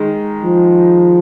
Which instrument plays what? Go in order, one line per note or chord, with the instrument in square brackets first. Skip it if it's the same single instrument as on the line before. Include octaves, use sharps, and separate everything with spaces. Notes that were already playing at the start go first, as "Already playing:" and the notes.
Already playing: [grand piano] D#3 G#3
[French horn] F3